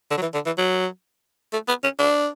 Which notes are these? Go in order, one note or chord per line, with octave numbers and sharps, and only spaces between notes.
D3
F#3
E3
D3
E3
F#3
A3
B3
C#4
D4